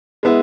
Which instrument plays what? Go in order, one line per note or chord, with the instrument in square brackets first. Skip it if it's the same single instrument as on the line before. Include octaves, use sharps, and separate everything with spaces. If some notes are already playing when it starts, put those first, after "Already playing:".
[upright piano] G#3 B3 E4